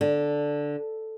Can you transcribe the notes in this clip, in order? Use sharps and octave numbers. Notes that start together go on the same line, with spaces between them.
D3